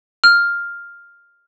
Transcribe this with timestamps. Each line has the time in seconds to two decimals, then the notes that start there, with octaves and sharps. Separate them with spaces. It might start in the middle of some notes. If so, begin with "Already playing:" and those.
0.24 F6